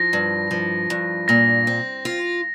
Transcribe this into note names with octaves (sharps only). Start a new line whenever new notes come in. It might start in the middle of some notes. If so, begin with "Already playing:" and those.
Already playing: F3 A#6
G2
F3
G2
A#2 A#6
C4
F4